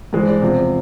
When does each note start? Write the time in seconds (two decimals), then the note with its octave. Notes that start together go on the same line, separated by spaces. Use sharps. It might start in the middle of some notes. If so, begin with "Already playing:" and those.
0.13 G2 E3 G#3 C5
0.27 D5
0.41 E2 C3 F3 C5